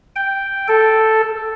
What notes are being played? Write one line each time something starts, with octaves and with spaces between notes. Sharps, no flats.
G5
A4